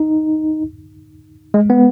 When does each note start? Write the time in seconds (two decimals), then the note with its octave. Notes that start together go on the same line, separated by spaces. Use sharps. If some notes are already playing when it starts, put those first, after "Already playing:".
Already playing: D#4
1.54 G#3
1.70 B3